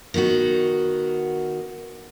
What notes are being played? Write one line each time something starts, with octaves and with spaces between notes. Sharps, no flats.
D#3 B3 D#4 F#4